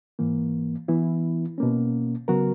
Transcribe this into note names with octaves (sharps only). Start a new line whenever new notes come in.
G#2 E3 A#3
E3 B3 E4
B2 A#3 C#4
C#3 F#3 B3 F#4 A#4